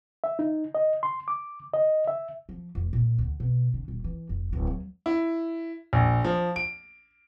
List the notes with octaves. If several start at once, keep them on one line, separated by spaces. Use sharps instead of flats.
E5
D#4
D#5
C6
D6
D#5
E5
F3
F1
A#2
D2
B2
D3
D#1
E3
F1
D1
F#3
E4
A#1
F3
D7